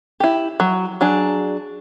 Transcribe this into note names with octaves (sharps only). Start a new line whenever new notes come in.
E4 G4
F#3
F#3 D4 G#4